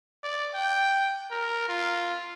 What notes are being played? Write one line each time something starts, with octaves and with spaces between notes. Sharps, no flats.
D5
G5
A#4
F4